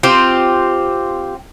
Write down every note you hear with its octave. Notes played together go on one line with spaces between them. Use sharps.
C4 F4 G4 C5